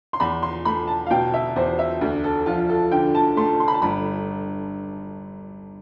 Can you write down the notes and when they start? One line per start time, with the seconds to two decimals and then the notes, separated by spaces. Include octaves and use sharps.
0.13 C6
0.20 E2 B5
0.43 C6
0.65 A3 B5
0.87 A5
1.07 F5
1.11 B2 G5
1.34 E5
1.56 E2 C5
1.79 E5
2.01 D2
2.24 A4
2.46 F3 F4
2.70 A4
2.92 D3 G5
3.15 A5
3.37 A3 C6
3.60 C6
3.68 B5
3.74 A5
3.82 G1 B5